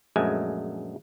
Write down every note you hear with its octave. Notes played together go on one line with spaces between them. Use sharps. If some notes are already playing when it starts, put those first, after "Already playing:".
A#1 F#2 G#3 A3 G#5